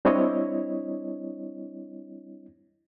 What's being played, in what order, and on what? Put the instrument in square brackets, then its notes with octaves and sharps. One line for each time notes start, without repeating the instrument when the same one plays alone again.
[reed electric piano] G3 C4 D4 E4 C#5 D#5